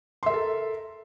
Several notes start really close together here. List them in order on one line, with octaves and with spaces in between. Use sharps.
C6 E5 A#4 A4